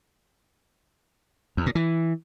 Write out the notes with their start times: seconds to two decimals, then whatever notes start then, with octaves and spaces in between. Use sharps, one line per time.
1.57 E2
1.66 A#2
1.75 E3